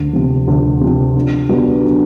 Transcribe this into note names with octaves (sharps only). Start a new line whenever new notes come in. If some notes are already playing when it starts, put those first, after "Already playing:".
Already playing: D2
C3 F3
D2
C3 F3
D3
F#3 B3 D4 G4
D3